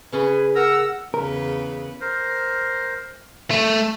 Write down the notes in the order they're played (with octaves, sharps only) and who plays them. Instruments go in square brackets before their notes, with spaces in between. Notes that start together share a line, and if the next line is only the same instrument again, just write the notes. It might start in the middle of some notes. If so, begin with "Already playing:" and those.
[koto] C#3 C#4 G#4 [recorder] B4
[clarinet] A#4 [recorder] F#5 [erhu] E6
[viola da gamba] E2 C#3 B4 [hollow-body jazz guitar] A#4
[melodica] A#4 C5
[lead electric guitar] A3